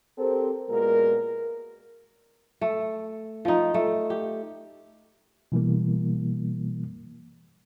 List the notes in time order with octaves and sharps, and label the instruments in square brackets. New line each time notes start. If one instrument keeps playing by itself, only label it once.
[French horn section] C4 G4 A4 A#4 C5
A#2 G#3 B3 F#4 A#4
[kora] A3
F3 D#4
A3
G4
[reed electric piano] B2 E3 G3 A#3